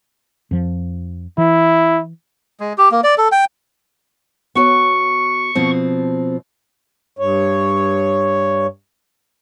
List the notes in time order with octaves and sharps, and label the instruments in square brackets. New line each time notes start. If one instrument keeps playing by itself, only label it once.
[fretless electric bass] F2 F3
[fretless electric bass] E3 [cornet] E4
[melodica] G#3
G4
A#3
D5
A4
G5
[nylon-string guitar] B3 F#4 C#5 [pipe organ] C#6
[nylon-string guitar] B2 F3 C4
[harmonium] G2 C#5